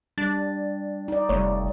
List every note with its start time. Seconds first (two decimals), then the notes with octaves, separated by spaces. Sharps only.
0.18 G3 D4 A6
1.08 D#4 D5
1.29 F1 G3 A3 C#5